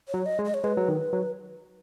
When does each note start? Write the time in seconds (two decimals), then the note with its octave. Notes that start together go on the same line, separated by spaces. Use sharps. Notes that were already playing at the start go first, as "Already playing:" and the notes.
0.09 C#5
0.14 F#3
0.26 D#5
0.39 G#3
0.45 D#5
0.54 C#5
0.64 G#3 B4
0.77 F#3
0.88 D#3
1.13 F#3